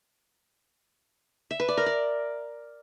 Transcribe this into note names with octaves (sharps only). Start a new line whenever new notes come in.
E5
B4
D5
A#4
D5